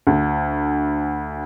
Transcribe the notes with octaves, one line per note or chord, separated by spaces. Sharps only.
D2